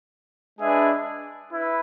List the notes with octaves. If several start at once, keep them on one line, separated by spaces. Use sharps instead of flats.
G#3 D4 G#4 B4 E5
E4 B4